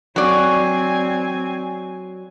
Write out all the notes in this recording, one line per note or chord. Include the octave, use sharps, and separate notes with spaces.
F#3 C4 D5 G#5